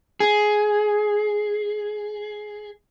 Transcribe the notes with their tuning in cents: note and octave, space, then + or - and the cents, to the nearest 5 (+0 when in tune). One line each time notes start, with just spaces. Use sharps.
G#4 +15